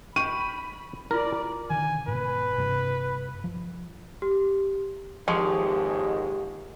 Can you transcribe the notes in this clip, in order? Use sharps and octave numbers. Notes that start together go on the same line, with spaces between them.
G5 B5 C#6 D#7
E4 F4 A#4 D5
B2 D3 D#3 G#5
G#2 B2 B4
G2 C3
F3
G4
G#1 D#2 G#2 F3 G#3 G4 C#6